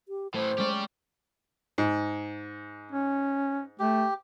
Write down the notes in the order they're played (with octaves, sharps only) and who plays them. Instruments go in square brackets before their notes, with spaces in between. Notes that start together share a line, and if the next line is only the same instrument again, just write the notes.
[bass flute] G4
[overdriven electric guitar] A2 E3 [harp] A3 [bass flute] C5
[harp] G#3 C#4 [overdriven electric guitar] G4 D5
[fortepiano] G#2
[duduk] C#4
[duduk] A3 [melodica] G4